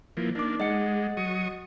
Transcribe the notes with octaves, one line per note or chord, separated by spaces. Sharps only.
E3 F3 A#3
A#3 D4 D#4 D6
G#3 D#5 F#5 C#7
F#3 C#6 D#6